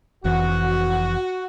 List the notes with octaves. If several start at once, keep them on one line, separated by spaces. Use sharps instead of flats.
F1 F2 E3 F#4